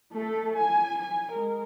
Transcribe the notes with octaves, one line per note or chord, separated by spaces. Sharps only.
A3 A4
G#5
G#5
G#3 A#4